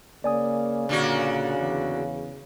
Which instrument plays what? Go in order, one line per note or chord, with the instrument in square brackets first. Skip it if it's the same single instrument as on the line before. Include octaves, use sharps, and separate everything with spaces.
[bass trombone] C#3 [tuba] A#3 [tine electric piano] D5 G#5 D#6
[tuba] A#2 [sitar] D3 A#3 F#4
[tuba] E2